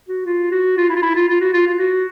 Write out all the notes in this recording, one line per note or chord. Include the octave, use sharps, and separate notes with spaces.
F#4
F4
F#4
F4
E4
F4
E4
F4
F4
F#4
F4
F4
F#4